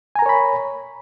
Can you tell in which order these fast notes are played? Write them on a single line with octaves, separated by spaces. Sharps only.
G#5 A#5 A#4 C#5 B5